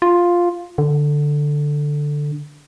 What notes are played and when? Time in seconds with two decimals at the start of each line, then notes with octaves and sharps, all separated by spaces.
0.02 F4
0.78 D3